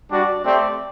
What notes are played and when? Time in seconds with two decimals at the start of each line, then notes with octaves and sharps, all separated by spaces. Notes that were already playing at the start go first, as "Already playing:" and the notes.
0.11 G3 D4 F#4 D5
0.45 A3 C4 G4 D5